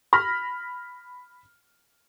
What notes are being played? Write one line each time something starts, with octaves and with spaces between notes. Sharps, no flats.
B5 F6 A#6